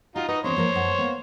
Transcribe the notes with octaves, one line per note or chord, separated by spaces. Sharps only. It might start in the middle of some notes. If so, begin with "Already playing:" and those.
D#4 F4 F#4
D#4 F#4 B4 D#5
E2 C4 D4 C5 C#5
F3 A#3 A#4
F#2 F#5 A5
A#3 B3